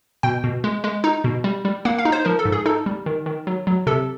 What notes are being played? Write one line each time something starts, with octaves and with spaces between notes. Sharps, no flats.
B2 G5
B2
G#3
G#3
D#4
B2
G3
G3
A#3 F#5
F5
D#4
C5
F3 A#4
A4
G#2
G#4
D#4 A4
G3
D#3
D#3
F#3
F#3
C3 A4